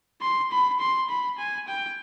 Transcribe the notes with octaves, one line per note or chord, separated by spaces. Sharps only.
C6
B5
C6
B5
G#5
G5